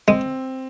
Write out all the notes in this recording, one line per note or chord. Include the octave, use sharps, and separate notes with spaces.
G#3 C4